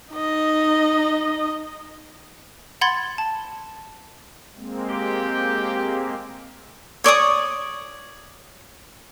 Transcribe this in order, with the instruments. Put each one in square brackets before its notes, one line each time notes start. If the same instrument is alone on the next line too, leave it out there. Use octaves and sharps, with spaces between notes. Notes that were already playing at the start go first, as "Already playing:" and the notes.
[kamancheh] D#4 D#5
[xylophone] F#5 B5 C6 G#6 A6
A5
[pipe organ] G#3 A#3 C4
[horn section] G4
[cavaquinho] C#5 D5 C#6 D#6